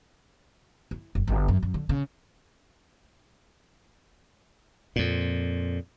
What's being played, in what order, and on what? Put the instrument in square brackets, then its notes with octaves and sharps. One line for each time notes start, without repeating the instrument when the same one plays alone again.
[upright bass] E4
F#1
G1
F#2
F#2
D3
C#3
[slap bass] F2 A#2